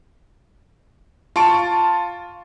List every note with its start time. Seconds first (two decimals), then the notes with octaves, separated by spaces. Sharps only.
1.36 F4 A5 C#6 D7